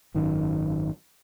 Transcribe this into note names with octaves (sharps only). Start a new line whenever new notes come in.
G#1 F#2 D#3